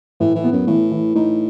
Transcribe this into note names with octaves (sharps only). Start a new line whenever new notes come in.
A2 E3
E3
B3
F#2
A2 E3
E3
A2 D#4